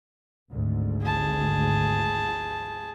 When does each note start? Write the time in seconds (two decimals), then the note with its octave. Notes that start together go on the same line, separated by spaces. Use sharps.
0.50 G#1 D2 G#2
1.03 G#4 A5